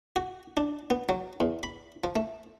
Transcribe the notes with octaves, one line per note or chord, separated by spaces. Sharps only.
F#4
D4
B3
F#3
E2
B5
F3
A3